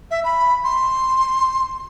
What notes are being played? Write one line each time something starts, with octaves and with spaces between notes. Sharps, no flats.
E5
B5
C6